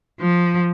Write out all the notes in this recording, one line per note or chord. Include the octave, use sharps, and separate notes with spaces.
F3